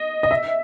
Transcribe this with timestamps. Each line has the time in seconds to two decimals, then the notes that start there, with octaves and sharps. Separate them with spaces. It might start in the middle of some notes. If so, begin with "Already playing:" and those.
Already playing: D#5
0.23 D#5
0.31 E5